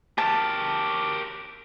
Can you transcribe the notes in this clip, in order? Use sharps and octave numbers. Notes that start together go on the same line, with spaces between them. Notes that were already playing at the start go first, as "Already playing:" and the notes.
G4 A#4 A5